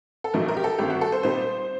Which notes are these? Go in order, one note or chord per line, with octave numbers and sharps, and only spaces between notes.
A4
A#1 A#2 F#3 A3 D#4 A#4
A#4
G4
A4
G1 G2 D#3 A3 C4 G4
F#4
A4
C5
A#2 G3 C4 D#4 C5